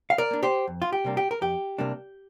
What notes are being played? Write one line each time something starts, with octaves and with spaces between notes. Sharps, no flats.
F5
A#4 D5
A#3 D4
G4 C5
F2
F4
G4
C3 G3 A#3 D4
G4
A#4
F2 G4
C3 G3 A#3 D4